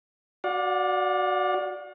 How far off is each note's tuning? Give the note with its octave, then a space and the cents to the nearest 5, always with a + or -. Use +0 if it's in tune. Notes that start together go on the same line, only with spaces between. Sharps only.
F#4 +0 D5 +0 F5 +45